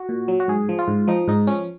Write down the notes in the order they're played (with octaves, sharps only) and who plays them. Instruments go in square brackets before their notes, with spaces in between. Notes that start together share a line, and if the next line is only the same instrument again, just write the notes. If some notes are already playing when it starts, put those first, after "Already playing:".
Already playing: [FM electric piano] F#4
A#2
F#3
F#4
G#2 G#4
F3
F4
G#2
F3 D#4
G#2 D#4
F3 C#4